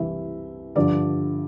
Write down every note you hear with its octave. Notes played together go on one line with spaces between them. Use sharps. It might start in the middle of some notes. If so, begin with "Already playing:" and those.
Already playing: C2 C3 E3 E5
G2 D3 F3 D5